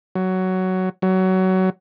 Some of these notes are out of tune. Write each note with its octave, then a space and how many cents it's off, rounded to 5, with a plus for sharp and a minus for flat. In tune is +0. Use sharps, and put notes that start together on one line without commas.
F#3 +10
F#3 +20